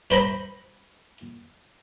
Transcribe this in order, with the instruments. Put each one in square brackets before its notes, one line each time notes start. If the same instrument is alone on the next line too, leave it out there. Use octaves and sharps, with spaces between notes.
[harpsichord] B4 C5 A#5 B5